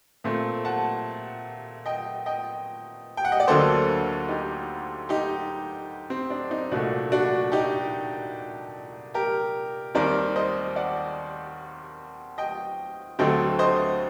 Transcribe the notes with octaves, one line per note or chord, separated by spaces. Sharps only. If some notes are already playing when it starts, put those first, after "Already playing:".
A#2 A3 C4
F#5 A5
D#5 G5
D#5 G5
G5
F#5
D#5
D5
D2 D3 F#3 A#3 A4 C5
D#4 G4
D#4 G4
C4
D4
C4 D#4
C2 A#2 A3 D4 F#4
D4 F#4
D#4 G4
G4 A#4
D#2 D#3 G3 C4 A#4 D5
C5 D#5
D5 F#5
D#5 G5
D2 D3 F#3 A3 C4 D#5 G5
C5 D#5